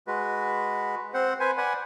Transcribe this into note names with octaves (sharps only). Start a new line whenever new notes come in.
G#3 F#4 B4
C4 C5 F#5
B4 C5 G#5
B4 D5 F#5 G#5